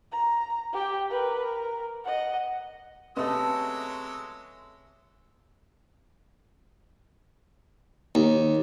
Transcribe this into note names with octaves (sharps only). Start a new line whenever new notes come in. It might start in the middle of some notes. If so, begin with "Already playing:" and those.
A#5
G4 G5
A#4 B4
A#4
D#5 F#5
C3 F#3 G#3 A3 B3 C#4 D#5 E6
D#2